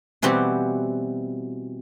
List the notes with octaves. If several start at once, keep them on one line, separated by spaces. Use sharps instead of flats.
B2 E3 G3 C4 F#4 G4